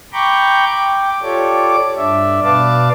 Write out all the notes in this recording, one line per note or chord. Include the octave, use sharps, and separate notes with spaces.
G5 A#5 B5 C#6 D6 G6
G5 D6
F4 G4 A4 C#5 D5 D6
G2 D4 D5 E5
B2 B4 D5 F5 A5 D6